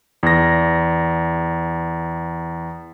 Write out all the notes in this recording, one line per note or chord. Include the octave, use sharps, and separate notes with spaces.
E2 A#6